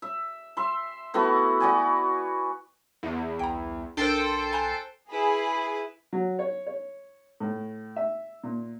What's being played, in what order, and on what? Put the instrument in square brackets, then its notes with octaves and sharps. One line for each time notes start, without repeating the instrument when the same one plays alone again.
[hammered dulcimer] E5
E5 C6
A3 B3 E4 F#4
F#4 D5 G#5
[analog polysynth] E2
[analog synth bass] C2 [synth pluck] G5 A#5
[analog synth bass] B1 [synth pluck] D4 A#4 [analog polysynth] A4 C5 G5
[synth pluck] G#5 A#5 F#6
[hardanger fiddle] E4 B4 [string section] G#4
[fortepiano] F#3
C#5
C#5
A2
E5
A#2